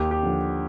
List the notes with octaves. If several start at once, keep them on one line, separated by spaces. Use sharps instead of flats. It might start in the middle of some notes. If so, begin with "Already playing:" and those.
Already playing: D#2 G4
G4
D3 F3